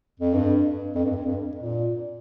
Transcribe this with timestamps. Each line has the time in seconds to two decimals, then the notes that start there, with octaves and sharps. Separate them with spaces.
0.19 F2
0.33 G2
0.95 F2
1.05 G2
1.16 F2
1.25 G2
1.57 A#2